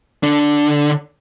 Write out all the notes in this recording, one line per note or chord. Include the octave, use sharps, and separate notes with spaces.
D3 D4